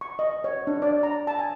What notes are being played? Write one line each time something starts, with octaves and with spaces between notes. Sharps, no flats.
C#6
D#5
C#5
D4
D5
A#5
A5
G#5